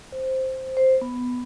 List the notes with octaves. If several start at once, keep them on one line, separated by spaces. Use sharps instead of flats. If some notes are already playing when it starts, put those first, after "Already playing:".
C5
C5
B3